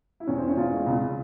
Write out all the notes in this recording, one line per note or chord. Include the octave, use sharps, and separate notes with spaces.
E4
E2 C#4
C4
E3
C#4
E2 F4
G#3
C#2